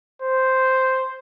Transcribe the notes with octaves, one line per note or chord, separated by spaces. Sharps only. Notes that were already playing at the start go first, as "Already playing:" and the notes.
C5